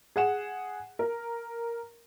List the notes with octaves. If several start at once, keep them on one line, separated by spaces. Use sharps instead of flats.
G#4 F#5 E7
A#4